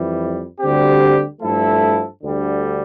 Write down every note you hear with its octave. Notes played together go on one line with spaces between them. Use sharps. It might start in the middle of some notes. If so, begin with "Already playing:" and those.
Already playing: F2 E3 G3
D2 D3 G3 C4 G4
G2 F3 A3 E4 A4
D2 D3 G3